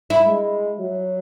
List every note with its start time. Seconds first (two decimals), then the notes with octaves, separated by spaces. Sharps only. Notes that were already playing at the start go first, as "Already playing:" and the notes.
0.10 E4
0.27 G#3
0.79 F#3